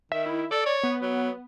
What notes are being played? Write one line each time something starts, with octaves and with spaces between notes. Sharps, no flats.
D#3 E5
E4
A4 D5
C#5
B3
F#3